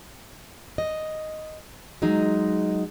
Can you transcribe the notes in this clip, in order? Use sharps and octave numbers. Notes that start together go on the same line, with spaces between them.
D#5
F#3 G#3 D#4